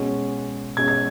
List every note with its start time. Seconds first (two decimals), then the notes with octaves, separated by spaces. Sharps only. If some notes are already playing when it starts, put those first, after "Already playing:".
Already playing: B2 G#3 C#4
0.77 B2 G#3 C#4 G#6
0.88 G#6